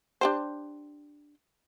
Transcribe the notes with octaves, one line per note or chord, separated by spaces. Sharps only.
D4 G4 C5